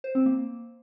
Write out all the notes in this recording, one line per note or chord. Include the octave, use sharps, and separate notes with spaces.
C5
C4
A#3